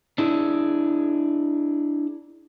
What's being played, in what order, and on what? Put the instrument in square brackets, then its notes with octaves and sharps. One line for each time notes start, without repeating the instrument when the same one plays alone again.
[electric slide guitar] D4 E4 G#4